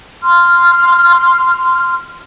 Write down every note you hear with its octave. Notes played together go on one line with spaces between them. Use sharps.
C6 F6